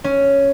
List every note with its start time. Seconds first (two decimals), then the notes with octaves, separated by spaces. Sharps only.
0.04 C#4